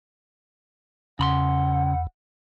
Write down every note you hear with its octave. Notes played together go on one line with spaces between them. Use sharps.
E2 C#3 F#5 B5 C6